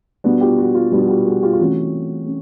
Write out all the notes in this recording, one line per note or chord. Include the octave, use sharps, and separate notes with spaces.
B2 G3 B3 D4 F#4
F4 G4
F#4
F4
B2 G3 B3 D4 F#4
F#4
F4 G4
F#4 G#4
F4 G4
F4
C3 E3 A3 C#4 F#4
C#4